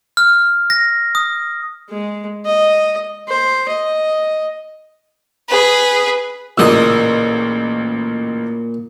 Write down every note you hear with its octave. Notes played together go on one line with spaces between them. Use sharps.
F6
A#6
D#6
G#3
D#5
C5
D#5
G#4 B4
A1 A#2 C#3 D#5 D#6 E6